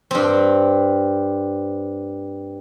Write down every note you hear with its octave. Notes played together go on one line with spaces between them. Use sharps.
G2 C4